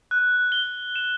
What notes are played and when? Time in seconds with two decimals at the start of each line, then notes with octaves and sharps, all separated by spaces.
0.11 F#6
0.52 G7
0.96 E7